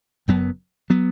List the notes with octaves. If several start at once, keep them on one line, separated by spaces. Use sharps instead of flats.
F#1 F#2 F#3 B3
F#3 B3